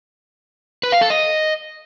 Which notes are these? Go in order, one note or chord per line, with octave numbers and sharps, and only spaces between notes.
B4
F5
A4
D#5